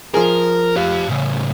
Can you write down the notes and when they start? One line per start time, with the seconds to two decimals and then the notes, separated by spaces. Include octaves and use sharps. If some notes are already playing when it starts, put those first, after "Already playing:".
0.14 F3 G#4 A#4
0.77 G4 F5
1.09 A2 C#3